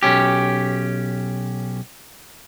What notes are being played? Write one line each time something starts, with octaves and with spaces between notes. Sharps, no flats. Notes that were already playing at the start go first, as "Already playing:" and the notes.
B1 C#4 G4